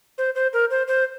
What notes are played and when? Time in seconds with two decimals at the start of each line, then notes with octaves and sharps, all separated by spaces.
0.18 C5
0.35 C5
0.53 A#4
0.71 C5
0.88 C5